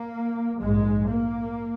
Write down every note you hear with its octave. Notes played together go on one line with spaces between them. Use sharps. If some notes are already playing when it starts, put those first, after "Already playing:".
Already playing: A#3
A#1 G#2 G#3
A#3